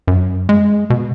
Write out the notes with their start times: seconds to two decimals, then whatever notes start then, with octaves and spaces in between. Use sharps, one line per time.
0.07 F#2
0.49 G#3
0.90 B2